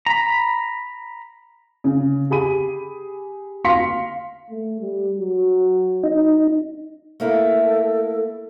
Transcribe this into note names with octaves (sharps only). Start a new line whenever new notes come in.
A#5 B5
C#3
G4 G#4 B5 D#7
F5 C6 A#6 B6 C#7
A3
G3
F#3
D#4
A3 A#3 E4 A4